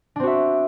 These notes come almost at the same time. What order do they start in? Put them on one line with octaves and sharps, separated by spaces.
D4 C4 F#4 E5